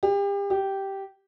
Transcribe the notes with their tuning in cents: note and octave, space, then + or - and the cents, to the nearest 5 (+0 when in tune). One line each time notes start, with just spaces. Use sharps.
G4 +35
G4 -10